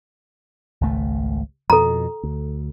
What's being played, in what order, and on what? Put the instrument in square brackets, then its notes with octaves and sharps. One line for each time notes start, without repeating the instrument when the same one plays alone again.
[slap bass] G#1 C#2 A3
[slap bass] F2 B2 [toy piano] A4 A#5
[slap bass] D2